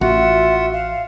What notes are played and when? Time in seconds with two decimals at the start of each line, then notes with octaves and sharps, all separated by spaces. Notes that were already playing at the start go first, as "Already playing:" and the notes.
0.01 A1 F4 F#4 E5 F#5
0.73 F5